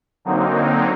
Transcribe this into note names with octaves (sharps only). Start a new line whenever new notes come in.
D3 F#3 A#3 C4 D#4